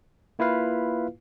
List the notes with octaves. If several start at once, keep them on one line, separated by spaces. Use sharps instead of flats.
A#3 E4 F4 B4 F5